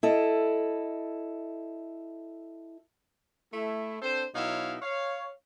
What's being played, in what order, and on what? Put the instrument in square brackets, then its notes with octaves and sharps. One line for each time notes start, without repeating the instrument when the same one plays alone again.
[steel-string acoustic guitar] E4 A4 D#5
[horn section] A3 E4
C4 D4 A4 C5
B2 F#3 D#4 E4 C#5 F5
C#5 F5